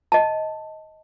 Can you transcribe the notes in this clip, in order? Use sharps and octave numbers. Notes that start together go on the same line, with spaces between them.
D#5 A5